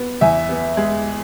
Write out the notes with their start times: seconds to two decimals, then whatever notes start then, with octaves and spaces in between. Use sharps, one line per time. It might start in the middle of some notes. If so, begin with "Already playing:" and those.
Already playing: B3
0.21 E2 E5 G#5
0.49 B3
0.77 G#3